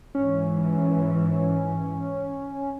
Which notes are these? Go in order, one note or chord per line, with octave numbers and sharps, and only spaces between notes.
G#2 E3 C#4